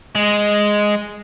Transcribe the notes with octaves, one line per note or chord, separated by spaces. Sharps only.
G#3